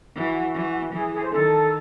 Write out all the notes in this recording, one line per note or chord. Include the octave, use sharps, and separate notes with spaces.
E3 F#4
E3
E3 G#4
G#4
C5
D#3 A4